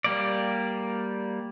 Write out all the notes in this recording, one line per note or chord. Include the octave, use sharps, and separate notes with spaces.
G3 A#3 D5